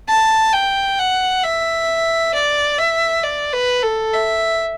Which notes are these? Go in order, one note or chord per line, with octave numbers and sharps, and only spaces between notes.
A5
G5
F#5
E5
D5
E5
D5
B4
A4
E5